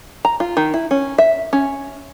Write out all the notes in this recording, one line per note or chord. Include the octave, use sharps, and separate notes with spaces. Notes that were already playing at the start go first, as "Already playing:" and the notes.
A#5
F4
D#3
E4
C#4
E5
C#4